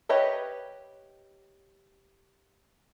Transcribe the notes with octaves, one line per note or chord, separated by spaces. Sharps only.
G4 B4 C#5 D#5 E5